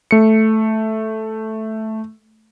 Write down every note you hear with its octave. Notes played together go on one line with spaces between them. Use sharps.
A3 C#7